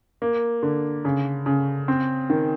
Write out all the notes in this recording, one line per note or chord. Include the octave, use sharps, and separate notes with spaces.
A#3
D3
C#3
C#3
C4
D#3